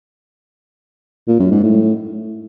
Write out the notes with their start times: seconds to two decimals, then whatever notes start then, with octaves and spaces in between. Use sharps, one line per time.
1.28 A#2
1.40 F#2
1.51 G#2
1.63 A2